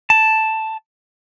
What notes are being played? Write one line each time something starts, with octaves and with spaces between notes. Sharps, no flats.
A5